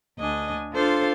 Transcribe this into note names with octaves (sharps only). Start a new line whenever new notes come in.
D2 D4 D#5 G#5
D4 F4 A4 C5 F5